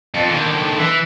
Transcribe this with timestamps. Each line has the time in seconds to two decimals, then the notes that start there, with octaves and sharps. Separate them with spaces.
0.14 F2
0.29 D3 D#3
0.79 E3